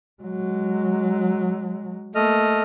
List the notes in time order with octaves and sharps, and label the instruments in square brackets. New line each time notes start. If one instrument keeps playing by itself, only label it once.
[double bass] F#3 G#3
[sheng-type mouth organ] A3 D#5 F6 [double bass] A#3